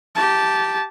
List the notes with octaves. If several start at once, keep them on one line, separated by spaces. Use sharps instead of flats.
G4 A5